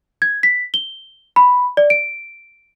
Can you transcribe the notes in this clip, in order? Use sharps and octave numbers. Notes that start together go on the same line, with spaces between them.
G#6
B6
G7
B5
D5
D7